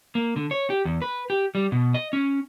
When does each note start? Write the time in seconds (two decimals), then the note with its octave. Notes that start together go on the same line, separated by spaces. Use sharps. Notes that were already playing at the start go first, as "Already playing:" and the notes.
0.15 A#3
0.36 D3
0.51 C#5
0.70 G4
0.85 E2
1.02 B4
1.30 G4
1.55 G3
1.72 B2
1.94 D#5
2.13 C#4